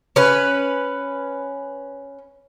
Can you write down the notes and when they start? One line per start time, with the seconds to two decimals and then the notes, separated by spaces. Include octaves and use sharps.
0.16 C#4 B4